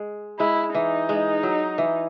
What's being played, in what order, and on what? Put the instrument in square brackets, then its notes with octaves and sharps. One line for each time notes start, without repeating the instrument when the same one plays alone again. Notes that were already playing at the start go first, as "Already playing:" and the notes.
Already playing: [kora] G#3
[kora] G#3 [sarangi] E4
[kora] E3 [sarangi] D#4
[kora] G#3
F#3
E3